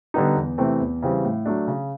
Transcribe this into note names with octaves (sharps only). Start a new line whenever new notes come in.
D3 G3 B3 D#4
E2
C3 E3 A3 C4
E2
C#3 E3 G3 C4
A2
F#3 A3 D4
C#3